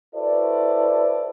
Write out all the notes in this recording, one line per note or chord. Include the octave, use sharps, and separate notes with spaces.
E4 F#4 A4 B4 C5 D5